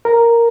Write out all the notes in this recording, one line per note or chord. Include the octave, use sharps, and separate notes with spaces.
A#4